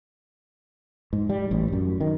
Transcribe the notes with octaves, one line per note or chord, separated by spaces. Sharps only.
G#2
G3
A1
F#2
D#3